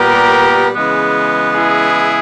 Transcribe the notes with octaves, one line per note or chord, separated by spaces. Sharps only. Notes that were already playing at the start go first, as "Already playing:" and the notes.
Already playing: A#2 G3 B3 G4 A#4
C#3 E3 G#3 B3
E4 G#4